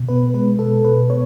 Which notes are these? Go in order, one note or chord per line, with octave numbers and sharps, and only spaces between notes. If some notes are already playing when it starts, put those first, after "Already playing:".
Already playing: B2
B3 B4
G#3 B4
B2 A4
B2 B4
B3 C#5